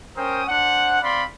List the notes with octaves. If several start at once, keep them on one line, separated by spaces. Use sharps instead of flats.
C#4 A#4 C5 G5 D#6
D4 C5 F#5
C4 D5 F5 B5 C6